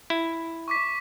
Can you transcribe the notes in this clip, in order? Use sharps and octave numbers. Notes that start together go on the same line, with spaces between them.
E4
C#6 D6 B6